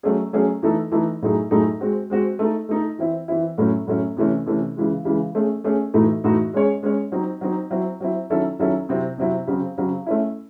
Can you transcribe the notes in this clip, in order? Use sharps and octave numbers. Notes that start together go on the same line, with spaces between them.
F#3 A3 C#4 G#4
F#3 A3 C#4 G#4
E3 A3 D#4 A4
E3 A3 D#4 A4
A2 F#3 A3 D#4 G#4
A2 F#3 A3 D#4 G#4
G#3 C4 F#4 C5
G#3 C4 F#4 C5
A3 D#4 A4
A3 D#4 A4
E3 C4 E4
E3 C4 E4
A2 F#3 A3 C#4
A2 F#3 A3 C#4
C3 E3 A3 C#4
C3 E3 A3 C#4
C#3 E3 G#3
C#3 E3 G#3
A3 C#4 G#4
A3 C#4 G#4
A2 E3 A3 D#4 F#4
A2 E3 A3 D#4 F#4
G#3 C#4 G#4 C#5
G#3 C#4 G#4 C#5
F#3 C4 D#4
F#3 C4 D#4
F#3 C4 E4
F#3 C4 E4
D#3 F#3 C#4 E4 A4
D#3 F#3 C#4 E4 A4
C3 F#3 C4 E4
C3 F#3 C4 E4
C#3 F#3 C4
C#3 F#3 C4
A3 C#4 E4